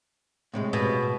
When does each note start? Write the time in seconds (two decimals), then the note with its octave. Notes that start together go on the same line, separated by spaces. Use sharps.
0.54 A2 C3 G#3
0.73 B2